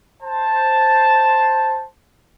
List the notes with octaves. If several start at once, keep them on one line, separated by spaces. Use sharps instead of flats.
C5 A5